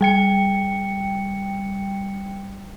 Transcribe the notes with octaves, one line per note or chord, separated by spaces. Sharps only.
G3 G5 C#7